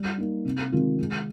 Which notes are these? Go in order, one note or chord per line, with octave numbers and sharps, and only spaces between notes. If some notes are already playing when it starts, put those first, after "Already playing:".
Already playing: G3
A#3 D#4
C3
D#3 G#3 C4 F4
G#3